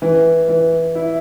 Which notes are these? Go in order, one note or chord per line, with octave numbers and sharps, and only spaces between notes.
E3
E3
E4